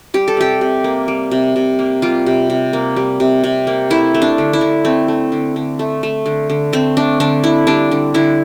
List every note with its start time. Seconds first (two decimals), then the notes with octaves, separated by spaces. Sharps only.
0.14 G3 G4
0.28 A4
0.37 C3 G4
0.61 C3
0.84 A#3
1.08 G3
1.31 C3
1.56 C3
1.79 A#3
2.02 G3 F4
2.26 C3
2.50 C3
2.73 A#3
2.96 G3
3.20 C3
3.44 C3
3.67 A#3
3.90 A3 E4
4.15 A3
4.22 D4
4.38 D3
4.53 E4
4.61 D3
4.85 A3 C4
5.08 A3
5.32 D3
5.56 D3
5.79 A3
6.03 A3
6.26 D3
6.50 D3
6.73 A3 C4
6.97 A3 D4
7.20 D3 D4
7.44 D3 E4
7.67 G3 D4
7.91 D3
8.14 D3 E4